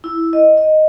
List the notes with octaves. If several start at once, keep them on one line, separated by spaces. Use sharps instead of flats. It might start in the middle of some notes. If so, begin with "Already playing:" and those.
E4
D#5
D#5